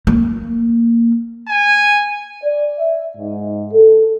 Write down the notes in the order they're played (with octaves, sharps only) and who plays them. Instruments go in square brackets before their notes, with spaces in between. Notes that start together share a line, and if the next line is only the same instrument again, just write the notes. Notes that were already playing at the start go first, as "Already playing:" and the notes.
[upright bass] A#3
[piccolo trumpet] G#5
[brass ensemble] D5
E5
G#2
A4